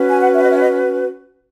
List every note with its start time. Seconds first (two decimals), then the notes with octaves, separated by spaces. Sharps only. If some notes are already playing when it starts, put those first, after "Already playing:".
Already playing: C#4 F#4 B4
0.10 G#5
0.21 F#5
0.32 E5
0.43 D#5
0.51 E5
0.59 D#5